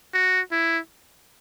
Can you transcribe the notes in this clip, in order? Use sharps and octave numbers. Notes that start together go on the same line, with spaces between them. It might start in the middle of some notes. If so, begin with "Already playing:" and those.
F#4
E4